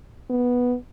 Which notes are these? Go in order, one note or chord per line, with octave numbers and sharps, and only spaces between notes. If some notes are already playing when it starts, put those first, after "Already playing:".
B3